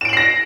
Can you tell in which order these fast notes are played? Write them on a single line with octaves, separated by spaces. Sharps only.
E7 D7 F#7 C7 A#6